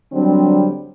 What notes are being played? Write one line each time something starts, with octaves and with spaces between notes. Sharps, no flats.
D3 F#3 G3 C4 D4